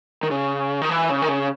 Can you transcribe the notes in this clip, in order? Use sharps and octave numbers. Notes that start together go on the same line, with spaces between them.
D#3
C#3
D#3
E3
C#3
D#3
C#3